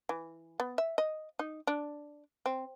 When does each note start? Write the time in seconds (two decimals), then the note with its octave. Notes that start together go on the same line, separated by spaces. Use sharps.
0.09 E3
0.60 B3
0.78 E5
0.98 D#5
1.39 D#4
1.67 D4
2.46 C4